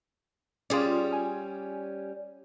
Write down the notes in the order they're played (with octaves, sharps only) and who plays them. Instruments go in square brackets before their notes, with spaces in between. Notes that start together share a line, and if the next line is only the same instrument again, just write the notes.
[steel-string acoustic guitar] G3 C#4 [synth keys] F4 G#4 D5
[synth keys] G#5